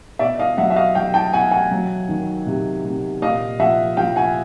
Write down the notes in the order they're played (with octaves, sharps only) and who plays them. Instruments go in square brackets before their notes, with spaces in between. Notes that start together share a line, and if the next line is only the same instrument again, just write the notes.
[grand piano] B2 D5 E5
D#5 F5
F#3 E5 F#5
E5
D#5 F5
F#3 F5 G5
G5 A5
B2 F#5 G#5
F#5 G#5
F#3
D#3
C3
C3
A#2 D#5 F5
F3 E5 F#5
F3 F5 G5
F#5 G#5